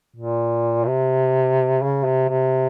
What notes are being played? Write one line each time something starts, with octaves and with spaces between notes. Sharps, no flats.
A#2
C3
C#3
C3
C3